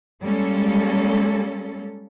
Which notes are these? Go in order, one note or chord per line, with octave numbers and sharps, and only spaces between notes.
G3 G#3 A#3 C#4 A4